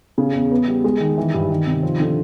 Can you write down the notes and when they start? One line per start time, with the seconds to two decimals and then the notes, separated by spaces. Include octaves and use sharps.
0.18 C#3
0.35 E2
0.51 B3
0.68 G3
0.84 G#3
1.00 D#3
1.18 E3
1.34 G2
1.50 D#3
1.66 C3
1.83 F3
2.00 D3